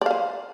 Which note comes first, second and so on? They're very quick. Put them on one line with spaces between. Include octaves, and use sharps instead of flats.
D5 F5 B4